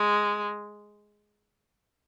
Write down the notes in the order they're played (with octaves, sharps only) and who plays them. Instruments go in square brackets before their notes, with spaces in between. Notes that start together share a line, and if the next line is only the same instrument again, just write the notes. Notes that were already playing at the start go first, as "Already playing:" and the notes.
Already playing: [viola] G#3